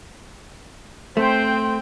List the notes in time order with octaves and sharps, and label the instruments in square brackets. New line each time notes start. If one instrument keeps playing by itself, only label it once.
[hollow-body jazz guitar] A3 [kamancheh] C4 G5 [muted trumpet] C5 [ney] C6